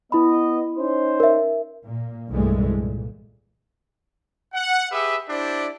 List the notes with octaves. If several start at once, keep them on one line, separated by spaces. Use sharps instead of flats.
B3 E4 D#5 B5
C#4 D#4 C5
A#4 E5
A#2 A#3
C2 G2 A#2 E3 G#3 A3
A#2
F#5
G4 G#4 B4 E5
D4 E4 G4 C5 D5